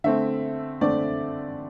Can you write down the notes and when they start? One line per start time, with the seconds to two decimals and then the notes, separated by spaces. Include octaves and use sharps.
0.04 D3 A3 C4 E5
0.81 D3 A3 C4 D5